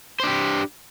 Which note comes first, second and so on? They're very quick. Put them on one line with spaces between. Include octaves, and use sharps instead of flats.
C5 D4 G4